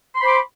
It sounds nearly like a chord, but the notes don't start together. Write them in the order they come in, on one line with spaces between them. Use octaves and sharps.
C6 B5 C5 D6